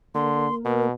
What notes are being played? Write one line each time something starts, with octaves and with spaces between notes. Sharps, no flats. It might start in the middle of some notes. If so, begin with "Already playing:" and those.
D3 A#3 C6
B2 A#4